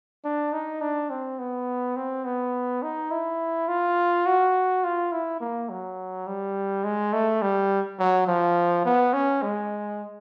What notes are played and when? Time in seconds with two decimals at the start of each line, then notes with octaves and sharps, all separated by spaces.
0.25 D4
0.53 D#4
0.81 D4
1.10 C4
1.39 B3
1.96 C4
2.25 B3
2.82 D#4
3.11 E4
3.69 F4
4.26 F#4
4.84 F4
5.12 E4
5.41 A#3
5.69 F#3
6.27 G3
6.84 G#3
7.13 A3
7.42 G3
7.99 F#3
8.28 F3
8.85 B3
9.14 C#4
9.42 G#3